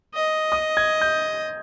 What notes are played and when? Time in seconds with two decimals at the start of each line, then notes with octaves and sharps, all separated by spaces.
0.15 D#5
0.52 D#6
0.77 G#6
1.01 G6